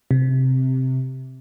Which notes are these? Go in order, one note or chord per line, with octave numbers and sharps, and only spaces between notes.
C3